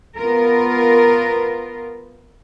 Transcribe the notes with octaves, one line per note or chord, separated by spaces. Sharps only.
B3 F4 A#4